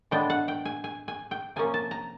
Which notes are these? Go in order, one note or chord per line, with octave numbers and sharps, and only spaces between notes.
A2 E3 G#3 B3 D4 G5
F#5
G5
G#5
G#5
G#5
G5
C3 F3 A#3 C#4 G#5
A5
A#5